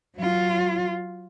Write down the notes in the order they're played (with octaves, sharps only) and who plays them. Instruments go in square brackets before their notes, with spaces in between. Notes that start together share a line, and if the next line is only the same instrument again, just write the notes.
[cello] F#3 F4